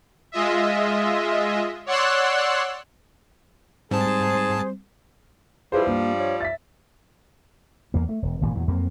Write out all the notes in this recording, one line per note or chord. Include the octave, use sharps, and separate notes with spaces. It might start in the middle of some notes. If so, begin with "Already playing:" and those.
G#3 F4 D#5 E5
C#5 D5 F#5 C6 E6 F#6
G#2 G3 C4 G#4 C5 A5
F3 G3 E4 G#4 B4 C5
G2 A#3
C#5
E5 A6 B6
E2 A#3
A3
E1
G#1 A#2 E3
E2 A#2 F#3
F2 F#3 A#3 C4